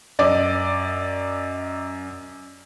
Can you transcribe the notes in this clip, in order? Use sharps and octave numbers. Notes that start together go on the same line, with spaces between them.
F#2 D5 D#5 D6